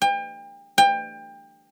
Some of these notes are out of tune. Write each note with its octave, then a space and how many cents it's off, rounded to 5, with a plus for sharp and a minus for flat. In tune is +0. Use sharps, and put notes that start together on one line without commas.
G5 +35
G5 +25